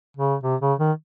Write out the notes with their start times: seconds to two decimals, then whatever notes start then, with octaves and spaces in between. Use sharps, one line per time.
0.17 C#3
0.43 C3
0.61 C#3
0.79 D#3